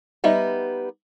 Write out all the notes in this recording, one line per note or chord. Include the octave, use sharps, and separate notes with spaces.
G3 B3 D#4 D#5 E5